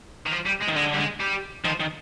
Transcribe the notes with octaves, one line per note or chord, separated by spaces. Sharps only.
D#3
F3
G3
G#3
D#3
D3 G#3
G3
G#3
G3
D#3 F3
D#3